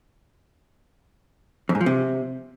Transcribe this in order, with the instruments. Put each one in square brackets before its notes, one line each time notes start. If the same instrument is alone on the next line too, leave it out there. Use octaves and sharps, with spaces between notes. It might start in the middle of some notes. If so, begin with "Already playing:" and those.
[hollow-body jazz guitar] F2
G#2
F3
C3